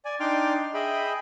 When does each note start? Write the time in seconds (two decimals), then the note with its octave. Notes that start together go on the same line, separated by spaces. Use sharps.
0.05 D5 G#5
0.20 D4 D#4 G5 C6 D6 F6
0.74 G#4 D#5 E5 G5 B5